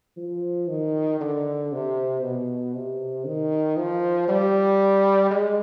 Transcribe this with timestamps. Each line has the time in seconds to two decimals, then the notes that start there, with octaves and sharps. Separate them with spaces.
0.17 F3
0.68 D#3
1.21 D3
1.72 C3
2.22 B2
2.75 C3
3.26 D#3
3.77 F3
4.28 G3
5.31 G#3